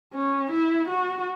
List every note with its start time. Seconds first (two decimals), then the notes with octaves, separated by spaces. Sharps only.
0.13 C#4
0.51 E4
0.89 F#4